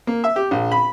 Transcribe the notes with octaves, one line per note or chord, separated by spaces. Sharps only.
A#3
E5
G4
A#1
B5